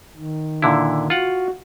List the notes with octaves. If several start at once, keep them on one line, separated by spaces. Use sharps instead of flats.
D#3
A#2 D3 E4
F4 F#4 F#5